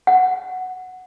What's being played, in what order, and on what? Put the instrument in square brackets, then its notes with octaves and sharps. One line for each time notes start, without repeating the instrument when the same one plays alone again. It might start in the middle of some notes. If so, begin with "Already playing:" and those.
[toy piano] F#5